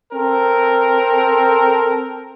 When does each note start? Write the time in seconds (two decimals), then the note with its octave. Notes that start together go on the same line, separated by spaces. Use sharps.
0.12 C4 A4 A#4